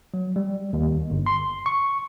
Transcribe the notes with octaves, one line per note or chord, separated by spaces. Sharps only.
F#3
G3
D#2
G1
C6
C#6